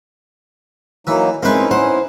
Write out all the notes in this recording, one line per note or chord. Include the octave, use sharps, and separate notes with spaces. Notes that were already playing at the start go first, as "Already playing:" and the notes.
E3 F#3 A#3 D#4
G#3 A#3 C4 C#4 D#4 E4 B4 C5
C5 F#5